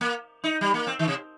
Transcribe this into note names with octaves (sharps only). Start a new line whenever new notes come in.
A#3
D#4
G3
A#3
C4
D#3
C3